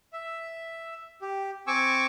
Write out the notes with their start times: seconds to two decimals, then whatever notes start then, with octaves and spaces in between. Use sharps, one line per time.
0.13 E5
1.21 G4
1.67 C4 G#5 C#6 D6 E6